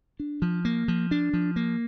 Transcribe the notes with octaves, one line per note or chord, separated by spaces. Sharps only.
D4
F3
A#3
F3
D4
F3
A#3